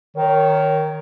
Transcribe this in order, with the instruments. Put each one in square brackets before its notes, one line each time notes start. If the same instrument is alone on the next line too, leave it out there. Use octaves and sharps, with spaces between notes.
[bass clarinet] D#3 [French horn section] A#4 C#5